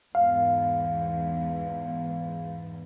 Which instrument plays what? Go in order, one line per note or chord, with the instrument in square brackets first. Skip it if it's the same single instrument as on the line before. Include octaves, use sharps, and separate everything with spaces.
[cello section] E2 G#2 [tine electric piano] F5